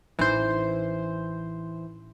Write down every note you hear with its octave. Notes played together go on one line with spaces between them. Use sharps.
A1 E3 D#4 C5